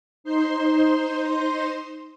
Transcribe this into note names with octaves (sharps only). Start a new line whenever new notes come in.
D#4 C5 C6